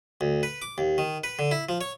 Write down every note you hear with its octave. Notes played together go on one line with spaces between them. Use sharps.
D2
B4
D6
D#2
D#3
B4
D3
E4
F3
C#5